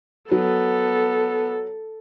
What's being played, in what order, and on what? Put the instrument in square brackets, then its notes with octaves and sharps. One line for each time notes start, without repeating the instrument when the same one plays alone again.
[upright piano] F#3 [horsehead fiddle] B3 [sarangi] A4